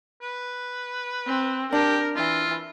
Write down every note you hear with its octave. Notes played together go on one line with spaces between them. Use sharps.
B4
C4
D4 G4 A#4
E3 F4